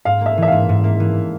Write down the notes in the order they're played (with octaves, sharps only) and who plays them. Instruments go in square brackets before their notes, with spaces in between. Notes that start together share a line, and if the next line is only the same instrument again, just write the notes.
[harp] G#2 [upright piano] F5
[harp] A#3 [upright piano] E5
[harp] E3 [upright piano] E5
[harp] G#2 [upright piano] F5
[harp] G#2
A#3
E3